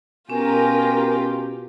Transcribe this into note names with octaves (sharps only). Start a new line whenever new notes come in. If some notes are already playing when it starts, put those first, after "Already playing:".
B2 C#4 F4 G4 A#4 G#5